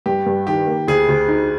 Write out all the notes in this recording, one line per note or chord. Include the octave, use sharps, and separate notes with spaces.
G2 G4
G2
D#3 G4
A#3
D2 G#4
D2
D#4